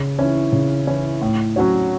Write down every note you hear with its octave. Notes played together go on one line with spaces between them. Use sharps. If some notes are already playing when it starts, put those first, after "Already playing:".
Already playing: C#3
E3 C#4 E4
C#3
E3 C#4 E4
A2
F#3 C#4 F#4 C#5